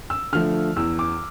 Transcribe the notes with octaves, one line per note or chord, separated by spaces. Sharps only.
E6
D3 F3 A3 F6
E2 E6
D6